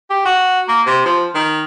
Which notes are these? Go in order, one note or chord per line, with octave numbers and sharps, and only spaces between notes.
G4
F#4
A#3
C3
F3
D#3